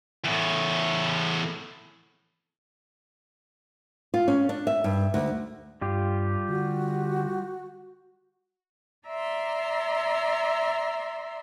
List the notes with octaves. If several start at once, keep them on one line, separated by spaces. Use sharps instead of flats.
E2 A2
F4
C#4
D4
E5
G2
D2
G2 G3 F4 G4
D3 F#4
D5 E5 A#5 C6